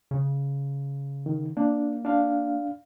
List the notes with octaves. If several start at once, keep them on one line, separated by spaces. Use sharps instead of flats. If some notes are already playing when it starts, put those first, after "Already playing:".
C#3
D#3
A#3 D4
D4 F5